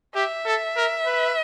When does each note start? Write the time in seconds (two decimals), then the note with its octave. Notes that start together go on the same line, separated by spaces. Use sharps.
0.15 G4 E5
0.46 A4
0.77 A#4
1.06 B4